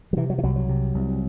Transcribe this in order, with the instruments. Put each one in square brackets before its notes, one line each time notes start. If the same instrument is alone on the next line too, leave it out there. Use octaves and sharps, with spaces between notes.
[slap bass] F#3
C3 E3
F#3
E3
C2 F#3
F#3
C3
C2